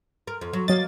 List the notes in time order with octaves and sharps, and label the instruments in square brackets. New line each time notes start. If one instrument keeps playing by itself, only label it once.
[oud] A#4
F2
F#3
[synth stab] F#3 A6 [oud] A#3 D#5